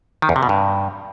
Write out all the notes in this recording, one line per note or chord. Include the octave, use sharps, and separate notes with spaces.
D#3
E2
C3
B2
G2